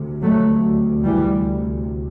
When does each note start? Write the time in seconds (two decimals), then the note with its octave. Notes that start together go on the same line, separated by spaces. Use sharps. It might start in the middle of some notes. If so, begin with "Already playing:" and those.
Already playing: D2 C3
0.21 F#3 A3
1.05 E3 G3